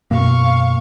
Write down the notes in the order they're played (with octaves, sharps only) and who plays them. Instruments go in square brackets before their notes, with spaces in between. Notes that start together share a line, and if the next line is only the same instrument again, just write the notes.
[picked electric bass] F#2 B2 A#3 [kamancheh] F5 C#6